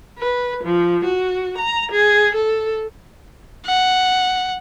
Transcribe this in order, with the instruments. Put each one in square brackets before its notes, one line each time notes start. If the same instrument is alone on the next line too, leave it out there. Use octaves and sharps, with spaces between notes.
[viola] B4
F3
F#4
A#5
G#4
A4
[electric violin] F#5